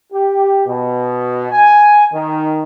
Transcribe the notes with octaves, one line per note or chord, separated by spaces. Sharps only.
G4
B2
G#5
D#3